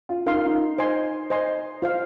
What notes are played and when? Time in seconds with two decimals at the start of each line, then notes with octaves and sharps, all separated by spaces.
0.09 F4
0.26 D#4 A#4 F5 C6
0.36 F4
0.46 D#4
0.78 C5 D#5 G#5 C6
1.30 C5 D#5 G#5 C6
1.82 F4 C5 F5